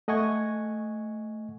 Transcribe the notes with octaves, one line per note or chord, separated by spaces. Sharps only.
A3 D#5 F#5 G#5 C#6 G#6